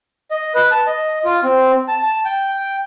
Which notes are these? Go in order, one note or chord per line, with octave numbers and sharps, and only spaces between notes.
D#5
B4
A5
D#5
F4
C4
A5
A5
G5